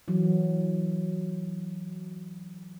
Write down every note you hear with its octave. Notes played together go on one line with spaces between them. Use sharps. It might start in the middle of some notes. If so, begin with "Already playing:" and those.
E3 F#3